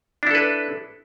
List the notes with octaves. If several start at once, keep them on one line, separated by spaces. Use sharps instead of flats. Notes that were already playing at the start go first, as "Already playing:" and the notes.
D4 E4 A4 B4